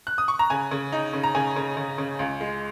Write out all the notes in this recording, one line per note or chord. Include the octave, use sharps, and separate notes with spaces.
F#6
D#6
C#6
A#5
C#3 G#5
C#3
D#4
C#3
A#5
C#3 G#5
C#3
C#3
C#3
C#2
G#3